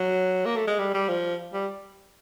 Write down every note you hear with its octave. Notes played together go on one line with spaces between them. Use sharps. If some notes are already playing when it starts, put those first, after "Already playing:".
Already playing: F#3
A#3
A3
G#3
G3
G3
F3
G3